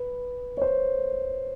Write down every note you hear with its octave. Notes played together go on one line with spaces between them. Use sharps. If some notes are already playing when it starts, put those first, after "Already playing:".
Already playing: B4
C#5
C5